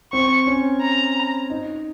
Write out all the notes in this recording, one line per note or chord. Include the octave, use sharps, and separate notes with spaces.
C4 C#6
C#4
A#5
D#4